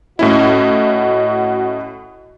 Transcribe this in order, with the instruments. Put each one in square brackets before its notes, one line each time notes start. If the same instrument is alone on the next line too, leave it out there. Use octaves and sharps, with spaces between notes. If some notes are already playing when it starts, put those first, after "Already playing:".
[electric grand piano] A2 C#4 E4 [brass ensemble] F#4 D#5